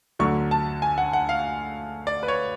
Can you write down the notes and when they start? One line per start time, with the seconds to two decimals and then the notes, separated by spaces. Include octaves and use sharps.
0.19 D2 D3 F#3 C#6
0.51 A5
0.82 G#5
0.98 F#5
1.13 F#5
1.29 F5
2.07 D5
2.23 B4
2.28 C#5